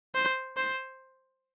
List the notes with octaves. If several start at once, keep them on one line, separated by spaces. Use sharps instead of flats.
C5
C5